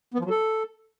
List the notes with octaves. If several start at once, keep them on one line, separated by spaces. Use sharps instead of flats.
B3
F3
F#3
A4